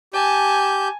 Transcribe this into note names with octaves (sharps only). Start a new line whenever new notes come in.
G4 G#5 A5 G6